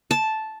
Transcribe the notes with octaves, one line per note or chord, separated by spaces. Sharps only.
A5